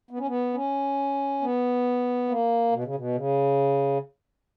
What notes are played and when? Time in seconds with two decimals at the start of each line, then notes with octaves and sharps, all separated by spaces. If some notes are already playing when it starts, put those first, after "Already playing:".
0.11 B3
0.19 C#4
0.27 B3
0.54 C#4
1.41 B3
2.29 A#3
2.72 B2
2.84 C#3
2.95 B2
3.15 C#3